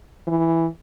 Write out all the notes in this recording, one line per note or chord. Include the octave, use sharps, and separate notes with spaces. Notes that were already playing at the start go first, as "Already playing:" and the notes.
E3